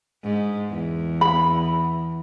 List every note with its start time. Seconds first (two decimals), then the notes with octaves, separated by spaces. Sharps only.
0.23 G#2
0.69 E2
1.21 B5